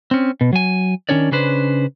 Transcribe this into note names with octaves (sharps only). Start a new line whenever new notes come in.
C4 C#4
B2
F#3 G#5
D#3 G#3 C#4 D4 C#5 D5
C#3 C#4 D4 B4 C5